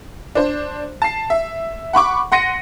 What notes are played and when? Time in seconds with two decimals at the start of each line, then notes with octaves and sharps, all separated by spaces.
0.35 D4 C5
1.02 A5 C7
1.30 E5
1.93 F#5 B5 C#6 D6
2.32 F#5 C6 A#6 C#7 D#7